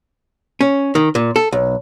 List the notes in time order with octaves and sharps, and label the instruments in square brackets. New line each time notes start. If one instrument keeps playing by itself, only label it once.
[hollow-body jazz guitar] C#4
D#3
A#2
A4
B1